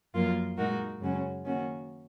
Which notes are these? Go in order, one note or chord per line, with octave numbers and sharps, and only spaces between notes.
F#2 F3 A#3 F4 A#4
A#2 G#3 D#4 F#4 A#4
F#2 C#3 G#3 C#4 F#4
D#3 A#3 C#4 F#4